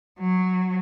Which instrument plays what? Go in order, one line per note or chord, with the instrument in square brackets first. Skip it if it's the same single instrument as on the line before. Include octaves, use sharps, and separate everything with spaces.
[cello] F#3